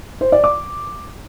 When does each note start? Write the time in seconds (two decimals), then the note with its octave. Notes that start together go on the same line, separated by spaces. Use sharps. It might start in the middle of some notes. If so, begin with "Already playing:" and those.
0.21 C5
0.32 D5
0.44 D6